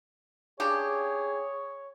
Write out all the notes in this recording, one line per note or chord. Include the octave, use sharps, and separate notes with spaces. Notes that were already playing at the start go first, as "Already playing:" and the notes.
C#3 D4 G4 G#4 C#5